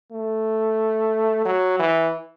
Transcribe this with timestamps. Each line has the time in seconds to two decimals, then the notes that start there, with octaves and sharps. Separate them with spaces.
0.11 A3
1.45 F#3
1.79 E3